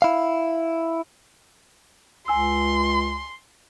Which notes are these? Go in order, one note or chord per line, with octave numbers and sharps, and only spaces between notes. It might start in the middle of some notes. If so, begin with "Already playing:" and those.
E4 F5
C#2 G#5 C6 E6